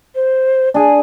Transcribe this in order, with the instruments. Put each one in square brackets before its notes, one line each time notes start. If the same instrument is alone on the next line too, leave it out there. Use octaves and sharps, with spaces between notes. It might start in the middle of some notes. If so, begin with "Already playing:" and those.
[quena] C5
[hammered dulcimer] D4 G#4 [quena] G#5